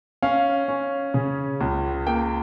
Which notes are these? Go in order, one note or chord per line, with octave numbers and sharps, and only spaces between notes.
C#4 F5
C#4
C#3
C#2
A#3 G5